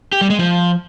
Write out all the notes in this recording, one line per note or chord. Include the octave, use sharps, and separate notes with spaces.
G4
G3
G#3
F3